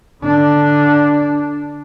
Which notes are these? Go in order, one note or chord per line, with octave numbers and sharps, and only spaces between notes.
D3 D4